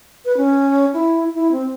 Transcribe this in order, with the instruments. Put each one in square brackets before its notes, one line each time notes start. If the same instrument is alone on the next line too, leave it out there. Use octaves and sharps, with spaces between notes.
[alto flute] B4
C#4
E4
E4
C4